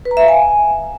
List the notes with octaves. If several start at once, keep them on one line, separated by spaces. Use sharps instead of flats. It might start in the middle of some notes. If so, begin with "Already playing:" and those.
B4
A#5
E5
F5
G#5